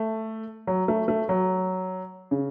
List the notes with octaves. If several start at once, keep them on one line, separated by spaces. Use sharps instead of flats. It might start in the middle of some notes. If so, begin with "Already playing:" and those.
Already playing: A3
F#3
A3
A3
F#3
C#3